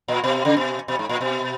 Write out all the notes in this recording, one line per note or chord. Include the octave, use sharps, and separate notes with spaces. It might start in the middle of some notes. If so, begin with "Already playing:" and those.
A#2
B2
C#3
B2
B2
G#2
A#2
B2